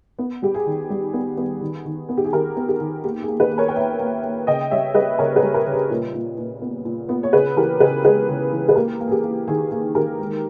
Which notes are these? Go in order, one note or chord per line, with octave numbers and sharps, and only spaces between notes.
B3
G3 G4
G#4
D#3
G3
B3
B3
D#3
D#3
B3
G4
G#4
D#3 G4 A#4
B3
G4
D#3
A#3 G4
G#4
A#3
G#4 B4
A#3
A#4 C#5
G5
A#3 C#5 E5
A#3
A#3
C#3 D#5 G5
G3 C#5 E5
G3 B4 D#5
C#3 A#4 C#5
G#4 B4
G3
G4 A#4
C#3
G#4
A#2
A#2
A#2
B3
A#2
B3
C#5
C#3 G#4 B4
E3 G4 A#4
C#3 G#4 B4
G#3 G#4 B4
C#3
E3
B4
A#3 G4 A#4
A#3
G#4
G4
A#3
D#3 G#4
A#3 G#4
D#3 G4 A#4
G#3